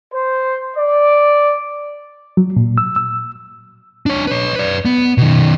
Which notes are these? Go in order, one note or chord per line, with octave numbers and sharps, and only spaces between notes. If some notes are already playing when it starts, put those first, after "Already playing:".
C5
D5
F#3
A#2
E6
E6
D4 C#5
B4 C#5
B4 D5
B3
B2 D#3